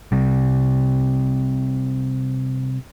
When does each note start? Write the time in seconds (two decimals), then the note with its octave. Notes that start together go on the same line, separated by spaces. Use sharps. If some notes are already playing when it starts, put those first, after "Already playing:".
0.12 C3 G3